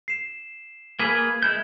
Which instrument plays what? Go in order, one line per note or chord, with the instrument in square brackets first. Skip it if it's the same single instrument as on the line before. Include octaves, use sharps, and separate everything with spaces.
[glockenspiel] C7 E7
[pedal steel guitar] A#3 G#4 B4 [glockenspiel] G#6
[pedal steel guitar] G#3 E4 G6